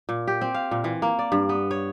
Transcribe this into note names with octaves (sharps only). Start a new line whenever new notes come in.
A#2
G4
C4
F5
A#2
E3
A#3
D5
G2
B3
C#5